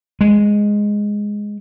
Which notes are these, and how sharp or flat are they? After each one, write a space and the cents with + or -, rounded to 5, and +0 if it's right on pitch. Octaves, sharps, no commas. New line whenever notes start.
G#3 -5